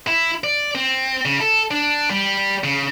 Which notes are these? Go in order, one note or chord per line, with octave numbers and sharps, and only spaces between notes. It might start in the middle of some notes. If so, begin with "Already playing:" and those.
E4
D5
C4
C#3
A4
D4
G3
C#3